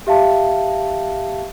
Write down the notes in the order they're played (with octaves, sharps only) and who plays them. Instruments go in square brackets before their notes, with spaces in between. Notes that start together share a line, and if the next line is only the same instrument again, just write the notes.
[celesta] G4 E5 F5 A5